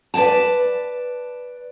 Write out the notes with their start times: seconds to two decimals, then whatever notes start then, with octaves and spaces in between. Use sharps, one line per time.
0.14 B4 D5 D#5 G5 A5